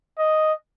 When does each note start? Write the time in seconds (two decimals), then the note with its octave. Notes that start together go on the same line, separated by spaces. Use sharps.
0.19 D#5